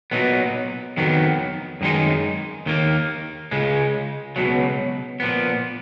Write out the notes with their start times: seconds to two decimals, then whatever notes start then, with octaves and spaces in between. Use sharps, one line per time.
0.11 B1 A#2 F#3 B3 D#4
0.97 F2 D#3 F#3 B3
1.81 F#2 D#3 G#3 D#4
2.66 D#2 D#3 A#3
3.51 C#2 C#3 G#3
4.36 C#2 B2 F#3
5.20 A#2 F3 B3